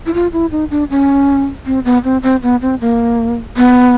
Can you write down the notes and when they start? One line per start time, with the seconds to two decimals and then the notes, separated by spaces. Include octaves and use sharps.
0.06 E4
0.14 F4
0.33 E4
0.51 D#4
0.71 D4
0.90 C#4
1.66 C4
1.85 B3
2.04 C4
2.23 C4
2.43 B3
2.62 C4
2.81 A#3
3.57 B3